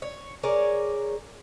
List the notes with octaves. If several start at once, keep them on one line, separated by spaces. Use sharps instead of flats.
C#5
G#4 A#4 C#5 D5